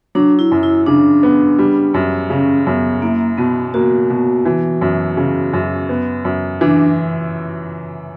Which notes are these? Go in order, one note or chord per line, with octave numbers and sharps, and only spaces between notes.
F#3 D4
E4
F#2
E4
C#3 D4
B3
G3
F#2
C#3 C#4
F#2 B3
A#3 E4
B2 B3
A#3 F#4
B2
E3
F#2
C#3
F#2
B3
F#2
E3 D4